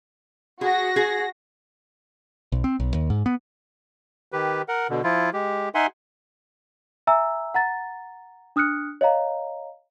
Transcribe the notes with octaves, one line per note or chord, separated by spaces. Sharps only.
F#4 G#4 A#6
G#4
B1
C4
B1
D#2
G#2
B3
D#3 G4 B4
A#4 F#5
B2 D3
F3 E4 F4
G#3 G4
D#4 E5 F#5 G#5 C6
E5 G#5 A#5 E6
F#5 A#5 A6
D4 D#6 F6 F#6 C#7
C#5 D#5 F5 A#5